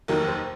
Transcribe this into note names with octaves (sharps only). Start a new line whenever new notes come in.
F1 D#2 D#3 F#3 A#4
C5